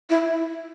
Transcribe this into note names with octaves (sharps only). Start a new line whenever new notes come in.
E4